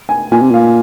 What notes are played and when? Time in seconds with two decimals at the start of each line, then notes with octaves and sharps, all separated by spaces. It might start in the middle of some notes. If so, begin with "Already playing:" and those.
0.09 G#5
0.31 A#2 G#5
0.42 C3
0.51 A#2 F5